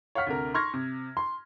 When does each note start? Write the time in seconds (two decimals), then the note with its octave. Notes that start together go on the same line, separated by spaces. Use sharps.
0.15 C#5 F5 F#5 F6 B6
0.27 D2 C3 A#4
0.54 C6 C#6 F6 G#6 A#6
0.74 C3
1.17 C6